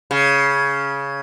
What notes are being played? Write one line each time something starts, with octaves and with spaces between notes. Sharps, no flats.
C#3